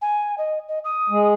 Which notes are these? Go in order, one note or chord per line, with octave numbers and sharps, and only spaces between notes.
G#5
D#5
D#5
D#6
G#3